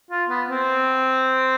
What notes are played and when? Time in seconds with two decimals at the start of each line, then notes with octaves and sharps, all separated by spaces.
0.11 F4
0.29 B3
0.48 C4